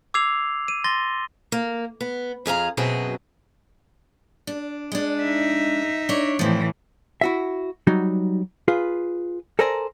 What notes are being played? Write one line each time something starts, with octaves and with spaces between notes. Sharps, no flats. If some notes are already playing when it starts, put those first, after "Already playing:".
D6 E6 G#6 C7 F7
D#7
C6 A6 A#6 G7
A#3
B3
F2 G#4 F5 A#5
F#2 B2 F#3 C4 G#4
D4
G#3 D4
D#4 E5
D4 C#5
A2 E3 F3 C4
E4 F#4 E5
F#3 G3 D#4 F#4
F4 G#4 B4
A4 A#4 C5 D5 G#5 A#5